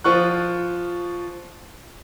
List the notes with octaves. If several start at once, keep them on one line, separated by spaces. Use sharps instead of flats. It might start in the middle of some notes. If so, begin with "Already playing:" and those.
F3 F4 C#6 F#6